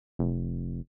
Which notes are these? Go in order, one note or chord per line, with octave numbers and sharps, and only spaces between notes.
F1